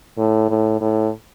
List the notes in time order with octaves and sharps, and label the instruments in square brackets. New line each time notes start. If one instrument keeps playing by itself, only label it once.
[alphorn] A2
A2
A2